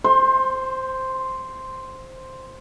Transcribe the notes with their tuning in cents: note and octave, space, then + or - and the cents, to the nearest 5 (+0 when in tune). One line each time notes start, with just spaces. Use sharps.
C5 +0 C6 +30